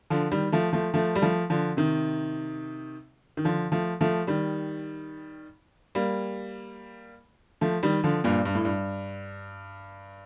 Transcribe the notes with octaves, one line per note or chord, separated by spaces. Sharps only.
D3 F3
D#3 G3
F3 A3
F3 A3
F3 A3
G3
F3 A3
D3 F3
C3 D#3
D#3
D3 F3
F3 A3
F3 A3
D#3 G3
G3 A#3
F3 A3
D#3 G3
D3 F3
G2 A#2
G2
A2
G2